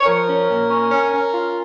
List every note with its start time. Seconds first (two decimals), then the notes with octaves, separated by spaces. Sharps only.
0.01 C#5
0.05 F3 A#4
0.27 C#4
0.48 A#2
0.69 C#4
0.91 C#4
1.11 C#4
1.33 F4